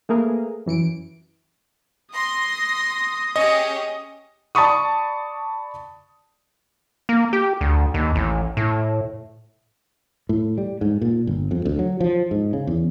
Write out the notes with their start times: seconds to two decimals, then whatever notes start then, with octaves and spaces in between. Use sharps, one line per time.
0.09 A3 A#3 G#4 A#4 B4
0.66 F#2 E3 C#7 D7
2.14 C6 D#6 A#6
3.36 C#4 G4 G#4 D#5
4.55 D5 A5 B5 C#6 D#6
7.09 A#3
7.33 G4
7.61 D2
7.94 D#2
8.15 A1
8.57 A2
10.29 A2
10.58 G3
10.81 G#2
11.01 A#2
11.27 G1
11.51 F2
11.65 D2
11.79 F#3
12.01 F3
12.31 G#2
12.53 C#3
12.67 E2